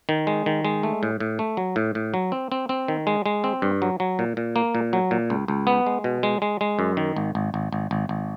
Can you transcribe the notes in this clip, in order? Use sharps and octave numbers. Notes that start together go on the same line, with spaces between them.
D#3
G#3
D#3
G#3
A3
A2
A2
A3
F#3
A2
A2
F#3
C4
C4
C4
D#3
G#3
G#3
C4
G2
F#3
F#3
A#2
A#2
A#3
A#2
F#3
A#2
C#2
C#2
B3
G#3
B2
G#3
G#3
G#3
F#2
D#3
G#1
G#1
G#1
G#1
G#1
G#1